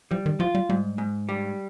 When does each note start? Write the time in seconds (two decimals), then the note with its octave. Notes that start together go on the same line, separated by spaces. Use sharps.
0.11 F3 G3
0.26 D#3
0.40 F3 F4
0.55 G3
0.69 G#2 G3
0.98 G#2
1.29 G3